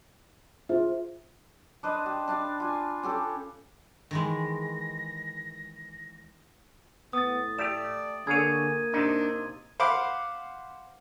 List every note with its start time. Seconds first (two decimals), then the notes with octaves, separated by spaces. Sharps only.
0.69 F4 G#4 C5 E5
1.83 D4 B4 C5 D#5
2.06 G4
2.28 D4 D5 F5
2.60 F4 G#5
3.03 C#4 G4 A4
4.11 D#3 E3 G#3 A#6
7.13 A2 B3 D#6 A6
7.59 A3 G4 D5 E7
8.27 D3 A#3 G#4 C#5 G#6 D#7
8.93 C3 D4 D#4
9.80 C5 F5 F#5 B5 D6